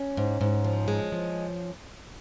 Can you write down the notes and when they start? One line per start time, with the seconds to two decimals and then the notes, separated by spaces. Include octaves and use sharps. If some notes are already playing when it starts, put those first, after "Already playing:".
Already playing: C#4
0.17 G#2
0.41 G#2
0.64 F3
0.88 G#3
1.12 F3